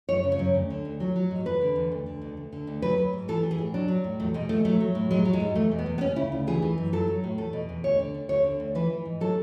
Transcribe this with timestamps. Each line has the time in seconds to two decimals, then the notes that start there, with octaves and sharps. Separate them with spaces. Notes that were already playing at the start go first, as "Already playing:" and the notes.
0.09 F#2 C#5
0.24 C#3
0.32 C#5
0.39 F#2
0.55 D2
0.70 D3
0.85 D2
1.00 F#3
1.16 F#3
1.31 G#2
1.45 E2 B4
1.61 D3
1.76 E2
1.92 D2
2.06 D3
2.22 D2
2.37 D2
2.53 D3
2.67 D2
2.82 F#3 B4
2.98 F#3
3.13 G#2
3.28 E3 A4
3.43 E3
3.51 G#4
3.58 A2
3.74 F#3 D4
3.88 F#3
4.04 A2
4.20 E2 A3
4.34 B2 G#3
4.49 E2 A3
4.65 F#3 A3
4.80 F#3
4.95 A2
5.11 F#3 G#3
5.25 F#3
5.33 G#3
5.40 G#2
5.56 E2 A3
5.72 B2
5.79 B3
5.86 E2
5.98 B3
6.01 D2 C#4
6.16 C#3 E4
6.32 D2
6.47 E3 G#4
6.62 E3
6.78 F#2
6.93 F#3 A4
7.08 F#3
7.24 A2
7.38 E2 A4
7.53 B2
7.69 E2
7.84 D2 C#5
7.99 D3
8.14 D2
8.29 D2 C#5
8.44 D3
8.60 D2
8.75 E3 B4
8.90 E3
9.05 G#2
9.21 F#3 A4